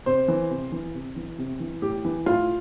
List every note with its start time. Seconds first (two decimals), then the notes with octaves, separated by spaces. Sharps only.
0.06 C3 C5
0.28 E3
0.50 C3
0.72 E3
0.94 C3
1.16 E3
1.38 C3
1.60 E3
1.82 A2 G4
2.05 E3
2.26 A2 F4